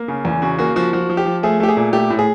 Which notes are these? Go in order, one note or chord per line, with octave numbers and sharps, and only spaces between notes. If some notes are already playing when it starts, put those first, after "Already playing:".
Already playing: A#3
C#3
E2
C#3 F#4
A#3 F#4
F3 F#4
F3 F#4
F3
G4
F3
A3 G#4
A3 G4
G#4
A#2
A3 G4
A2
G#4